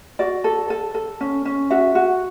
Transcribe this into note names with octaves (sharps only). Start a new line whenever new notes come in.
F#4 D5
A4
A4
A4
C#4
C#4
F#4 E5
F#4